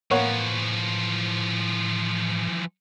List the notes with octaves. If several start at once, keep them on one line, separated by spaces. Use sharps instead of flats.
A2 E3 F3 A#3 C#5 F#5